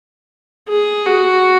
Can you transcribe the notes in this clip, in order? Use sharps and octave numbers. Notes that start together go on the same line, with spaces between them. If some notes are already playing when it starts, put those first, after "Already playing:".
G#4
F#4